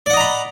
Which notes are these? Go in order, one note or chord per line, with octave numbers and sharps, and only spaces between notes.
D5 D#5 F#5 A#5 B5